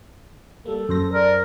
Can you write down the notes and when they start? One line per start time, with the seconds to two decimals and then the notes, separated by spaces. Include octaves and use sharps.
0.66 G3 A#3 A4
0.89 F#2 C5 A#6
1.13 A#4 D5